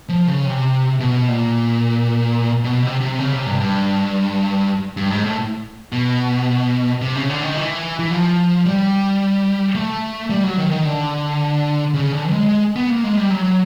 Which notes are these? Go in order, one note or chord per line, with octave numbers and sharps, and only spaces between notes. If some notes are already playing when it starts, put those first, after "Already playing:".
F3
C#3
C3
B2
A#2
B2
C3
C3
C#3
C3
G2
G2
G2
G#2
A2
B2
C3
C#3
D3
D#3
E3
E3
F3
G3
A3
G3
F#3
D#3
D#3
D3
C#3
D3
G#3
G#3
B3
A#3
G#3
G3
F#3
F#3